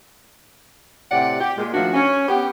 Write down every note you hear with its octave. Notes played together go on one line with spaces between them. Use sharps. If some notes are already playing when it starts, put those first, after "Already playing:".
A2 C3 G4 D5 F#5
G4
A#2 G#3
D#3 F3 A3 D4 F#4
C#4
B3 G4